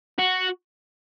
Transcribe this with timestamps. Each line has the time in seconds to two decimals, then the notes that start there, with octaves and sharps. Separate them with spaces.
0.18 F#4